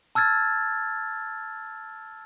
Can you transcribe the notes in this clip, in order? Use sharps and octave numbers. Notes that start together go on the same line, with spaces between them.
A5 E6 F6 G#6 A6